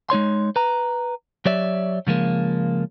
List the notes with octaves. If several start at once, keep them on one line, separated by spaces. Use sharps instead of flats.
G#3 D#4 C#5 C6
B4 A#5
F#3 G4 C#5 D5 E5
C#3 F3 G#3 A#3